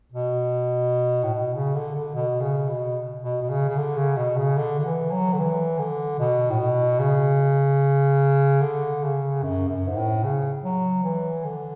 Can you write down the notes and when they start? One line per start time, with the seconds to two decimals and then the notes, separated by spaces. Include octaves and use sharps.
0.12 B2
1.24 A2
1.34 B2
1.54 C#3
1.75 D3
1.95 D3
2.15 B2
2.41 C#3
2.69 B2
3.23 B2
3.42 B2
3.49 C#3
3.69 C#3
3.77 D3
3.97 C#3
4.17 B2
4.37 C#3
4.57 D3
4.79 D3
4.85 E3
5.12 F#3
5.33 D3
5.39 E3
5.78 D3
6.19 B2
6.50 A2
6.59 B2
6.99 C#3
8.61 D3
9.02 C#3
9.43 F#2
9.69 F#2
9.87 G#2
9.97 A2
10.24 C#3
10.64 F#3
11.04 E3
11.44 D3